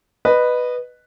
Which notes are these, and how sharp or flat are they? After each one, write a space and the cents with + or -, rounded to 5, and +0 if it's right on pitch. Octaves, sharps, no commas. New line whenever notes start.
B4 +0 D#5 -20